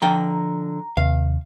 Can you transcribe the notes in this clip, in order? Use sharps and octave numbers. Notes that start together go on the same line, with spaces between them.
D3 F3 G5 A#5
D#2 C3 F5